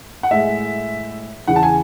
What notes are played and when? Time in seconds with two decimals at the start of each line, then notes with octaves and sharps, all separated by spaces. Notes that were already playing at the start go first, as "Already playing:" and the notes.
0.23 F#5
0.31 A2 G#3 E5
1.47 E2 C#3 E3 F#5
1.56 A5
1.63 G#5